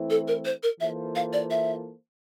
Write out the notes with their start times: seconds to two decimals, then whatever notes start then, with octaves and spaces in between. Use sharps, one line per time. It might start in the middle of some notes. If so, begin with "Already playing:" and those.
Already playing: E3 A3 C4 E4
0.10 A4
0.28 A#4
0.45 C5
0.63 A#4
0.80 E3 A#3 F4 A4 C5 E5
1.15 F5
1.33 D5
1.50 E5